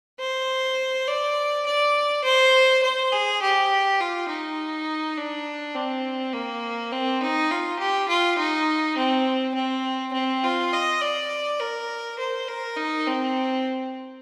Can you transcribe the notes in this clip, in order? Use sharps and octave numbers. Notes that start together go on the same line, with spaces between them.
C5
D5
D5
C5
C5
G#4
G4
F4
D#4
D4
C4
A#3
C4
D#4
F4
G4
F4
D#4
C4
C4
C4
F4
D#5
D5
A#4
C5
A#4
D#4
C4